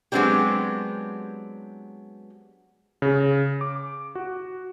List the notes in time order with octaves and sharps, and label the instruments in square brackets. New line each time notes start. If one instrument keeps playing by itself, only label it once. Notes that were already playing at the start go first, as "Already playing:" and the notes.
[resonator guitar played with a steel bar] F#3 G#3 B3 C4 D4 G4
[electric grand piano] C#3
D6
F#4